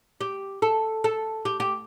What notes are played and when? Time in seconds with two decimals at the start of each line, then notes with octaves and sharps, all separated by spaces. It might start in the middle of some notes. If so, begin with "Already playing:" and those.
0.21 G4
0.62 A4
1.04 A4
1.45 G4
1.60 G4